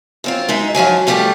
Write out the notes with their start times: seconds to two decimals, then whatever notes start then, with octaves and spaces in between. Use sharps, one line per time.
0.24 F#2 C4 F4
0.49 G#3 D#4 E5
0.75 F#2 F3 F#3 G#5
1.07 F3 G3 A3 B3 G4 A4